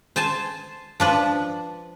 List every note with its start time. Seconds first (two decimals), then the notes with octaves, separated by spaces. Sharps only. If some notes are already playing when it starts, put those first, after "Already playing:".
0.16 C5 G#5 A5
1.00 F3 D4 B4